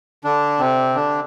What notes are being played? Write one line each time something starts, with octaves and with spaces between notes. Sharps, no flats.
D3 D4
C3 C4
D3 D4